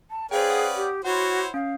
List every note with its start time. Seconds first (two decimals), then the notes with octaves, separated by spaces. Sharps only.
0.11 A5
0.31 C#4 G#4 B4 C5 D5 F5 G5
0.50 F#5 D#6
0.76 G4
1.05 E4 F#4 C5 C#5 F#5 C6
1.54 C#4 F5